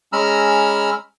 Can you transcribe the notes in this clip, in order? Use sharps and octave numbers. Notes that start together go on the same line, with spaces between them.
G#3 C#4 A#5 B5 E6 F6